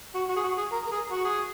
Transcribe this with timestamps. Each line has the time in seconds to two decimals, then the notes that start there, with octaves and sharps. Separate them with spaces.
0.15 F#4
0.29 F#4
0.36 G#4
0.44 F#4
0.58 G#4
0.72 A#4
0.88 A#4
0.92 G#4
1.11 F#4
1.25 G#4